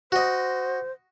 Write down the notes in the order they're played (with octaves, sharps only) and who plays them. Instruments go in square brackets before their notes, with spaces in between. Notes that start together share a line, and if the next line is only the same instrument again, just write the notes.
[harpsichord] F#4 D#5 [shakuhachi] C5